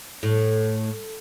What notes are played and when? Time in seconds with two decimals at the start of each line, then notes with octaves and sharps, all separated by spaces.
0.23 A2